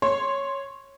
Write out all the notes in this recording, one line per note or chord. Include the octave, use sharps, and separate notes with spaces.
C#5 C6